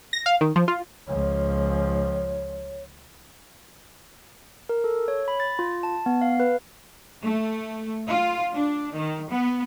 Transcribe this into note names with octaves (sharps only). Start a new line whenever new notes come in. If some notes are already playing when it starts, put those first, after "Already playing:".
A#6
F5
D#3
F3
F4
C#2 F3 C#5
A#4
A4
C#5
B5
A6
F4
A5
B3
F5
B4
A3
F4
D4
D#3
B3